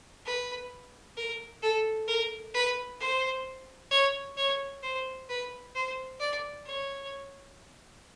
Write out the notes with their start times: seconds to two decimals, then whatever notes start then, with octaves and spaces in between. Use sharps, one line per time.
0.25 B4
1.16 A#4
1.62 A4
2.07 A#4
2.54 B4
3.00 C5
3.91 C#5
4.37 C#5
4.82 C5
5.29 B4
5.75 C5
6.20 D5
6.66 C#5